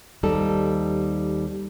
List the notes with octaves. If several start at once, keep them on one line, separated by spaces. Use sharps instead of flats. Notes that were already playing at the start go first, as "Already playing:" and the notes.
D#2 G3 C4 D#4 A4